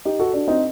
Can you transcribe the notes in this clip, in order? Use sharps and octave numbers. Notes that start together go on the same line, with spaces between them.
D#4 G4
F#4 A4
D4 F#4
C4 D#4